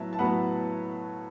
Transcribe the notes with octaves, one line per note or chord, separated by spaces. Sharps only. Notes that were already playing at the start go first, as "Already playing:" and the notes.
Already playing: A2 F#3 B3 E5 A5
A5
A2 F#3 B3 F#5 B5